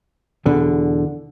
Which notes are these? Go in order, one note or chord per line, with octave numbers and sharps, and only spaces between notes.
E2 B2 D3